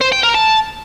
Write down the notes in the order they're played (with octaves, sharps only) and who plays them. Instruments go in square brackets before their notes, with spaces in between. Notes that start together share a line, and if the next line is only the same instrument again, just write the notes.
[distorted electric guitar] C5
G5
A#4
A5